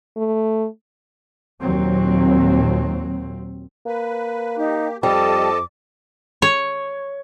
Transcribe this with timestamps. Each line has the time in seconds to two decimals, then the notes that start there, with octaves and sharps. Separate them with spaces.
0.17 A3
1.61 D#2 A#2 F#3 C4
3.86 A#3 B4
4.57 D#4 G4
5.03 F2 G3 A4 D#5 A5 D6
6.42 C#5